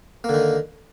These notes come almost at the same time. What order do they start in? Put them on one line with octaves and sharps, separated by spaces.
A#3 D3 D#3